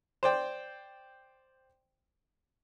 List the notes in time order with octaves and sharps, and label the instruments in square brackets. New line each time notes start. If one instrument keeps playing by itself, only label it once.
[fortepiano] C5 D5 G5